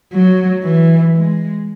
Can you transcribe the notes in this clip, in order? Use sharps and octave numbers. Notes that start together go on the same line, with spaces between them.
F#3
E3
G#3